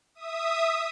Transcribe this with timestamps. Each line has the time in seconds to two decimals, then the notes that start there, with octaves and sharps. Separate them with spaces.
0.15 E5 D#6